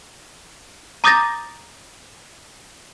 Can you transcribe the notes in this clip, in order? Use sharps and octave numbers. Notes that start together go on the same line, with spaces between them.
A#5 D6 D#6 G6 A6 A#6